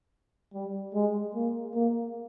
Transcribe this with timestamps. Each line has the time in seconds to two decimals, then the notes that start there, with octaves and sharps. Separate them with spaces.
0.53 G3
0.95 G#3
1.35 A#3
1.74 A#3